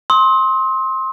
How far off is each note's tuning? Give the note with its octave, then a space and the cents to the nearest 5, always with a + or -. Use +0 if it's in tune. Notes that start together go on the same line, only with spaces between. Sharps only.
C6 +20 D#6 +45